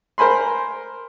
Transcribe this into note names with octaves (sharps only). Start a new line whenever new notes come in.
A#4 C5 G#5 B5 C6